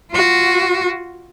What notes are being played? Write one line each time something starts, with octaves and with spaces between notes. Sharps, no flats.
F4 F#4